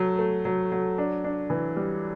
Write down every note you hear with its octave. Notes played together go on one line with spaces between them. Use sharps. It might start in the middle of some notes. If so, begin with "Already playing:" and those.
Already playing: F#3 A3
A3
F#3
F#3
D4
D4
E3
G3